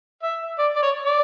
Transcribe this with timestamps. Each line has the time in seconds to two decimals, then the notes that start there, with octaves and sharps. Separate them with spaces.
0.23 E5
0.59 D5
0.76 D5
0.82 C#5
1.05 D5